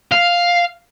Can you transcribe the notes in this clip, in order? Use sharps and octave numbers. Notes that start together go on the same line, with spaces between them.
F5